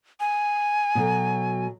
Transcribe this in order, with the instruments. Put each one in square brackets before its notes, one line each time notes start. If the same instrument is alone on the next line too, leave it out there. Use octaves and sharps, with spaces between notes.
[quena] G#5
[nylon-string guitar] B2 F#3 A4